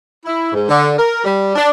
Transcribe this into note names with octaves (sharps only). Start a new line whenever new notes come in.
E4
G#2
D3
A#4
G3
D4